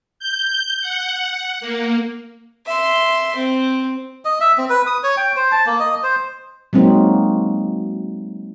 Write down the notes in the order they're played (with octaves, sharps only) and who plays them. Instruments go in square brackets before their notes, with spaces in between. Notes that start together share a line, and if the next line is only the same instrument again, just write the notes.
[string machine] G6
F#5
A#3
[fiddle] E5 C6
C4
[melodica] D#5
E5
C4
B4
D#6
C#5
G5
C5
A5
A#3
D#5
C5
[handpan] F#3 G#3 A#3 C4 D#4